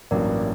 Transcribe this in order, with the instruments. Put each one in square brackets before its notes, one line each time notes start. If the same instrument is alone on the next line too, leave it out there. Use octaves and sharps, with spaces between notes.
[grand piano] A1 G2 F#3 A#3 [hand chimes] A#4 D5